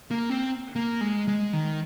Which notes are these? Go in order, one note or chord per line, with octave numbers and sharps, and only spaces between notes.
A#3
C4
A#3
G#3
G#3
D#3